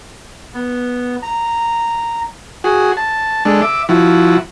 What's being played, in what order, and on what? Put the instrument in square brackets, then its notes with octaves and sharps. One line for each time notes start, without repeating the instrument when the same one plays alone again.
[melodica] B3
A#5
[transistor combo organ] F#4 G#4
A5
G#3 D4 A4
E5 D6
F3 E4 F#4